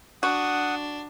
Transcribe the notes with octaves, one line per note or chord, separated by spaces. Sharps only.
D4 F#4 F#5 D#6